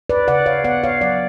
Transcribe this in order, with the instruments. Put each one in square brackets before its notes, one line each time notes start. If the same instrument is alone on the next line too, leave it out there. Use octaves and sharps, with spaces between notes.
[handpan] B4 D5
C#3 D5 F#5
C#5 F5
B3 D5 F#5
C#5 F5
F#3 D5 F#5